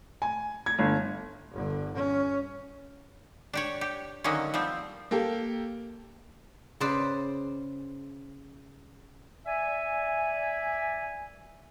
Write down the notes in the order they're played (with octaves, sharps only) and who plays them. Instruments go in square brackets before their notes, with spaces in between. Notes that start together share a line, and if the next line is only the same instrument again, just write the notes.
[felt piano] G#5
G#6
G1
[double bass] G1 D3
C#4
[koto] D4 G4 C#5
G4
D3 D#3 F#3 G#3 A#3 C#4
F3 G3 C4
[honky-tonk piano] A#3 G4 A4
[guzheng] C#3 B4 C5 D5
[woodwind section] D5 E5 G#5